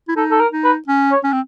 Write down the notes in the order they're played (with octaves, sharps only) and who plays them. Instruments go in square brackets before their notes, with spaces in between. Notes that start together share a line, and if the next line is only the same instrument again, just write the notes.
[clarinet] E4
[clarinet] D#4 [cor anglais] A4
[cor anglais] A4
A#4
[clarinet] D#4
[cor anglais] B4
[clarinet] C#4
[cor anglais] C#5
[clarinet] C#4
C4